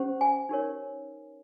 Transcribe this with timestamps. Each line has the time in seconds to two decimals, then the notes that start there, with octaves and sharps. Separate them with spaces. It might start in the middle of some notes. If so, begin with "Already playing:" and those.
Already playing: C#4 G4 C5
0.21 G#5
0.49 D#4 G4 A#4 C#5